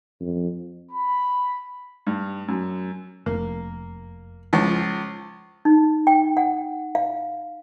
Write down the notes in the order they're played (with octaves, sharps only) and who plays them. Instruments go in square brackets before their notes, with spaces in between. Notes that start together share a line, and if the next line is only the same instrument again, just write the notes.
[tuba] F2
[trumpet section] B5
[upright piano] G2
F#2
[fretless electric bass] F1 [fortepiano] A#3
[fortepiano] C#2 F3
[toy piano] D#4
G5
F#5
F5